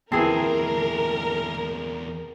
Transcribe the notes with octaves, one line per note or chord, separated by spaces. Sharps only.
E2 A#2 E3 C4 G#4 A#4 A5